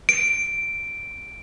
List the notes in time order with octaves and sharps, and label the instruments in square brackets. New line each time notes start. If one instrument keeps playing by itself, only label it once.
[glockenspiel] D7